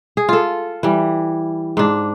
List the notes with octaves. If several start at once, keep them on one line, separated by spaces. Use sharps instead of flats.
G#4
F4 A4
E3 G3
G#2 D4